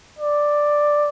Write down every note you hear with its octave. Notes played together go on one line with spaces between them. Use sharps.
D5